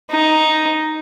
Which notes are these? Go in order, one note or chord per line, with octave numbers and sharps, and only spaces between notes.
D#4